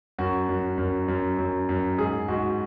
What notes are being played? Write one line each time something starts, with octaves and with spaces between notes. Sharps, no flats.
F#2 F#4
F#2
F#2
F#2
F#2
F#2
G#2 G#4
G#2 F#4